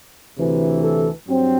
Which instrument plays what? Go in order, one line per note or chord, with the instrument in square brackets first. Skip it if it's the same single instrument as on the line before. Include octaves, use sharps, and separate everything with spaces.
[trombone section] D2 C3 E3
A4
G2 F#3 C4